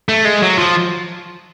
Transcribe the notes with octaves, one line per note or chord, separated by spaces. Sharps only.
A3
G#3
F#3
F3